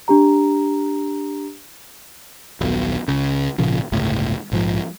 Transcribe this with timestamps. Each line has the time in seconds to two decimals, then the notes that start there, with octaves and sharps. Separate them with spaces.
0.08 D4 G4 A#5
2.61 D#1 B1 B2
3.08 C#2 C#3
3.58 G#1 A#2 C#3 F3
3.92 G1 C#2 A2
4.51 A#1 G#2 F3